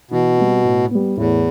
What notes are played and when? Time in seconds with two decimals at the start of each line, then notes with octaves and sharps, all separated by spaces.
0.11 B2 E3
0.38 G3 C4 F#4
0.65 A2
0.91 G3 B3
1.17 E2 A2